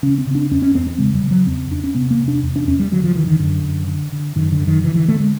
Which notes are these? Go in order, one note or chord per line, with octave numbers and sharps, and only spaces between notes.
C#3 C#4
C4
C#3
D4
E2 C#4
C#4
E2 C4
C4
C#3 G#3
G3
C#3
F#3
E2 C4
E2 D4
C#4
C3 B3
A#3
C3
D4
E2
D4
E2 C#4
G3
D3 F#3
F3
D3 E3
D#3
F#2 D3
F#2
D3
D3
F#2 D#3
D3
F#2
D#3
D3 E3
E3
D3 A3
G#3